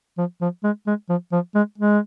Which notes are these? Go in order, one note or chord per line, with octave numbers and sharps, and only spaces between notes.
F3
F3
G#3
G#3
F3
F3
G#3
G#3